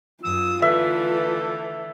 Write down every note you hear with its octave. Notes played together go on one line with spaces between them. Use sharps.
F#2 F4 D#6 E6
D3 E3 A3 B4 E5